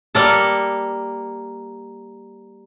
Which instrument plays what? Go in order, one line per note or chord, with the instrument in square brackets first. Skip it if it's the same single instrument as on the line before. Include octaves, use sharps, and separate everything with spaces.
[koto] G3 A#3 A4